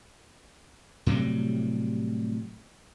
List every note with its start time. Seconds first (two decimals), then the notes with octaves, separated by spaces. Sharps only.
1.06 A2 C3 F#3 G3